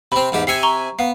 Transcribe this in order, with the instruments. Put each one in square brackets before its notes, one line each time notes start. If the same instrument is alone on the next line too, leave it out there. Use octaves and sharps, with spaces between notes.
[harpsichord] C3 C4 [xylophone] B5
[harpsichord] E2 G#2 G4
[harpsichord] C3 E5 G#5 [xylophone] C7 C#7
[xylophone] A#5 C#6 G7
[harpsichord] B3 [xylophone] F5